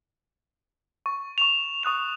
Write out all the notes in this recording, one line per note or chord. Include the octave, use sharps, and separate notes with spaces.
C#6
C#6 E7 F7
C#6 D#6 F#6 F7